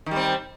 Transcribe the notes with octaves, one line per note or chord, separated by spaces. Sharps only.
D#3 G3 C4